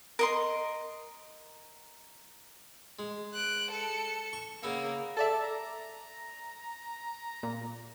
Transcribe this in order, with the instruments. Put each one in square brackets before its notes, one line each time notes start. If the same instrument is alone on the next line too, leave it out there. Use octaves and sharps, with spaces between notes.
[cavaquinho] A#4 D#5 C6
[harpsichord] G#3
[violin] F#6 D7
A4 C#7
[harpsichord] C#6
[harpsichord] C#3 B3 E5 [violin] A#3
[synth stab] A4 D5 E5 [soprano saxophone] A5
[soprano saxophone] A#5
[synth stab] A#2